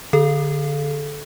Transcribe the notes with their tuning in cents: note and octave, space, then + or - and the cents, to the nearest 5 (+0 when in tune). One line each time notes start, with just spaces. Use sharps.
D3 +0 A4 -15